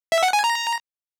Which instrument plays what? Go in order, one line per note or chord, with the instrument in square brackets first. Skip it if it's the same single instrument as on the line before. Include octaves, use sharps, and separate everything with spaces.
[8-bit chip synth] E5
F#5
G#5
A#5